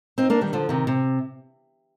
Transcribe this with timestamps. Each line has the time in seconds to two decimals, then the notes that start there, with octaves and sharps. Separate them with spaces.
0.18 C4 D#4
0.30 A#3 D4
0.41 D#3 G3
0.53 D3 F3
0.69 C3 D#3
0.87 C3